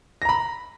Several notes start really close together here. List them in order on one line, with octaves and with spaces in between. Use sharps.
A#6 A#5 B5